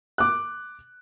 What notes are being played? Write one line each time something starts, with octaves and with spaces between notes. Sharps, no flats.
D6 F#6